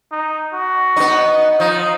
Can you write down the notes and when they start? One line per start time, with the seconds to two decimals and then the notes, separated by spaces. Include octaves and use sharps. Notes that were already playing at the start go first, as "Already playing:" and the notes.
0.12 D#4
0.54 F#4
0.97 B3 D#4
1.60 F3 D#4